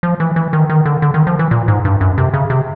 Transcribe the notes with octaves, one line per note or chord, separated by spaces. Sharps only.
F3
E3
E3
D#3
D#3
D3
D3
D#3
F3
E3
A#2
G#2
G2
F#2
C3
C#3
C3